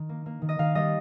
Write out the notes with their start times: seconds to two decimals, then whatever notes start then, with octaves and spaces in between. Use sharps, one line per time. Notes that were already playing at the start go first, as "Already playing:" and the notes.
Already playing: D#3
0.09 A#3
0.26 A#3
0.42 D#3
0.49 D#5
0.59 D#3 F5
0.75 G3 D#5